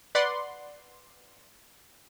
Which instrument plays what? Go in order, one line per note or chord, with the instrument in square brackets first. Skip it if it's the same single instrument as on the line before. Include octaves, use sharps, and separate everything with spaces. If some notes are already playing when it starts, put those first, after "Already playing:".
[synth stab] B4 D5 F#5 C6